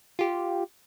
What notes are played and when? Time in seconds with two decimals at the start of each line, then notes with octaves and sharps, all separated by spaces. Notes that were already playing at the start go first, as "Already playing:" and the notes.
0.19 F4 G4